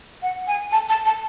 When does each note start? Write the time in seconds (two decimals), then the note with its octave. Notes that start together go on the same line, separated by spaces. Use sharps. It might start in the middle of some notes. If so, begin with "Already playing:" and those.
0.23 F#5
0.47 G#5
0.72 A5
0.89 A5
1.06 A5